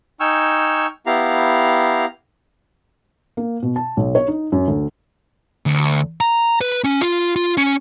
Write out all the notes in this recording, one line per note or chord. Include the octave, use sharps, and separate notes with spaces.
D#4 G5 G#5 C#6 E6 F6
B3 E4 G4 F5 A#5
A#3
B2
A5
B1
C#5
D#4
F#2
D2
D2
A#5
B4
C#4
F4
F4
C#4